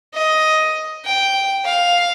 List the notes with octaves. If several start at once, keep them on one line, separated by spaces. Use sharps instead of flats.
D#5
G5
F5